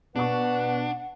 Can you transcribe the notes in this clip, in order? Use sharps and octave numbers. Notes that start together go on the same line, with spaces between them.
B2 D4 B4 F#5 C#6